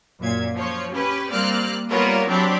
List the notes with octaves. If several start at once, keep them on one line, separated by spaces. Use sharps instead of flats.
F#2 A#2 G#6
F3 C#5
C#4 G4 B4
G3 A#3 C4 D5 F6 F#6
G3 A#3 B3 F4 A#4 C#5
F#3 C4 D4 G4 C#5 B5